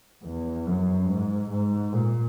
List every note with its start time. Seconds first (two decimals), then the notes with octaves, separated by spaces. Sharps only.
0.24 E2
0.66 F#2
1.08 G#2
1.49 G#2
1.92 A#2